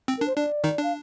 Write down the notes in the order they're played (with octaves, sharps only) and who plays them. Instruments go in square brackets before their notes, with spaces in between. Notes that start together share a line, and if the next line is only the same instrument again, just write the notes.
[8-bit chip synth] C4
[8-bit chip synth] D4 [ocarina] A#4
[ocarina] C5
[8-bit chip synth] D4 [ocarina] D5
[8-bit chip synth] D#3 D#4
[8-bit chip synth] D4 [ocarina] F5